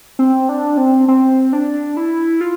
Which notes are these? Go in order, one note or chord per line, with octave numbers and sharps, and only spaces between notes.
C4
D4
C4
C4
D4
E4
F4